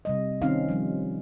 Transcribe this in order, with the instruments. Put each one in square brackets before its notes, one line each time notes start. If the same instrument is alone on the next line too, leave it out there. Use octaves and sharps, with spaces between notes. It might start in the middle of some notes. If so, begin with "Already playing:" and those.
[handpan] C3 G3 D#5
D#3 C4 C#4 D#4 F5
F3 G3